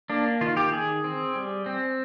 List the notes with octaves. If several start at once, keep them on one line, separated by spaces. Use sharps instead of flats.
A#3 D4
D#3 F4
G4
D#3 G#4
C4
G3
C4